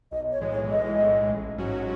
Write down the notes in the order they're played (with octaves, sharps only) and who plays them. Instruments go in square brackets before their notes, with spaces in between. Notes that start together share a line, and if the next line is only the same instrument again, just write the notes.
[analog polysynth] B1 [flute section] D#5
[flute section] C#5
[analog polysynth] A2 E3 G#3
[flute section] C#5
[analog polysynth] B1 [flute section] D#5
[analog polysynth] A2 E3 G#3
A1
G#2 F#3 C#4 F#4